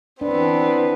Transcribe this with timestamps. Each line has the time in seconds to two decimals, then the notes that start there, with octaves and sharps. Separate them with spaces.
0.21 E3 B3 C4 D4